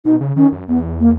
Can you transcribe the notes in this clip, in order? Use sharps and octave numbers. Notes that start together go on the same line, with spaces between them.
B2 D#4
C#3
D#3 C#4
F#2
E2 B3
A#3